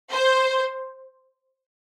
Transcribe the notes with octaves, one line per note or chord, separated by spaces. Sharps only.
C5